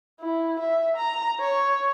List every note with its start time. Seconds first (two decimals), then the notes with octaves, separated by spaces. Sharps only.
0.20 E4
0.59 E5
0.96 A#5
1.40 C#5